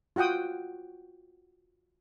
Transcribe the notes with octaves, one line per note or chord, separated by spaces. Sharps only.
F4 F#4 F#5 G5 D#6